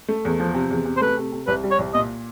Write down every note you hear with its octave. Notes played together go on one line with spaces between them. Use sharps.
A3
E2
F3
C3
E2
C3
C5
A3 B4
C3
C3
C2 B4
G3
C#5
C2
A#2 D#5